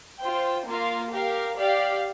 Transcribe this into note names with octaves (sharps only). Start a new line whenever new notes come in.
F4 C5 G5
A#3 F4 A#4 F5
G4 A#4 F5
G4 D5 F5